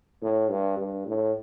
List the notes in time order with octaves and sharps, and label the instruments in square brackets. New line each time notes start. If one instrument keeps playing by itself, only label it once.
[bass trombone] A2
G2
G2
A2